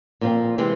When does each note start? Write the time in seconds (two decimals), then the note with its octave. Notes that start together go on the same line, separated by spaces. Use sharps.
0.21 A#2 F3 C4
0.58 C3 E3 G#3 C4